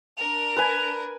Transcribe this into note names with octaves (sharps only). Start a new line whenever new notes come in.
D4 A#4 F7
B4 G#5